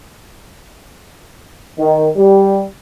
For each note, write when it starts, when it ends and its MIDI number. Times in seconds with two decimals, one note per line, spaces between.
1.78 2.06 51
2.16 2.62 55